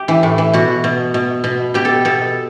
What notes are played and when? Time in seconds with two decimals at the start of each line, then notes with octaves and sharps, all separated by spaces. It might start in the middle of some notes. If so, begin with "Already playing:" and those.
Already playing: G4
0.08 E3
0.23 A2
0.38 E3
0.53 B2 F#4
0.84 B2
1.14 B2
1.44 B2
1.74 B2 G4
1.85 A4
2.05 B2 A4